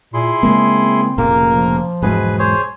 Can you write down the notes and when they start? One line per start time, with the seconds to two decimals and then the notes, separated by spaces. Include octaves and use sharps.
0.14 A#2 E4 G#4 C6
0.43 C#3 G#3 A#3 C4
1.18 F1 A#2 C#3 A#3 A#4
1.53 F3
2.02 E1 G#2 F#3 G#4 B4
2.39 G#4 C5 C#5